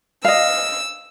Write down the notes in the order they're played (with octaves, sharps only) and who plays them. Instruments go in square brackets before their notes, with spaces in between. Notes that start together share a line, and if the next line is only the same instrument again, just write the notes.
[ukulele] D#5 F5 [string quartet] E6